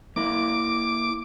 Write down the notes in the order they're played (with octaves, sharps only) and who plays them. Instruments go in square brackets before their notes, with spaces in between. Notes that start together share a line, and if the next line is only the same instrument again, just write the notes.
[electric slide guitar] A#3 E4 A#4 [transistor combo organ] D6